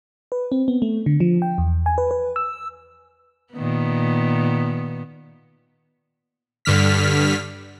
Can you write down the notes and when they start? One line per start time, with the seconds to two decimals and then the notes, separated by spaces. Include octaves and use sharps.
0.32 B4
0.52 C4
0.68 B3
0.82 A3
1.06 D3
1.20 F3
1.42 G5
1.58 E2
1.86 G#5
1.98 B4
2.11 B4
2.36 E6
3.53 A#2 D#3 B3
6.65 G2 D3 F6 B6